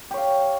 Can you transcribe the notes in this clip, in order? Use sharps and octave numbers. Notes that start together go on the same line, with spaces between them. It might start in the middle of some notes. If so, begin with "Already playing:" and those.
G4 C#5 F5